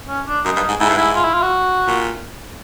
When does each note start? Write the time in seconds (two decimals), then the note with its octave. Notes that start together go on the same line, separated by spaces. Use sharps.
0.08 C#4
0.27 D4
0.45 F#2 D#4
0.56 G2
0.69 G#2
0.80 G#2 E4
0.89 G2
0.97 G#2 E4
1.15 F4
1.24 E4
1.34 F4
1.42 F#4
1.87 A#2